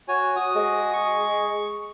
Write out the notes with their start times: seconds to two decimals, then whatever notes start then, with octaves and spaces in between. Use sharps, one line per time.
0.08 F#4 C#5 G#5
0.36 F#4 D#6
0.56 G#3
0.93 C#6